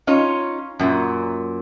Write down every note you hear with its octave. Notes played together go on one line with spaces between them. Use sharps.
C#4 D#4 F4 C#5
F#2 A#2